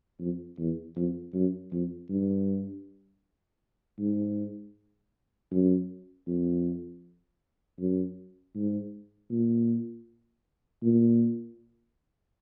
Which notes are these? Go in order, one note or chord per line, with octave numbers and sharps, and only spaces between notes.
F2
E2
F2
F#2
F2
G2
G#2
F#2
F2
F#2
G#2
A#2
A#2